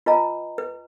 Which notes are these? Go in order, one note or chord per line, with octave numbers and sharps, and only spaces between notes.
F4 B4 D#5 G#5 A#5
B4